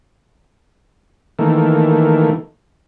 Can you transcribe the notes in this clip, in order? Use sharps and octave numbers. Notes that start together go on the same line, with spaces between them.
D#3 E3 A3 A#3